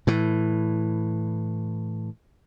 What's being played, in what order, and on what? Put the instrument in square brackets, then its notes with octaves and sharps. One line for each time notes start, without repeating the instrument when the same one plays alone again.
[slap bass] A2 E3